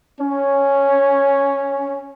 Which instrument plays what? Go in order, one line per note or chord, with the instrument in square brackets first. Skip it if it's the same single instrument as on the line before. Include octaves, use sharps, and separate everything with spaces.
[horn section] C#4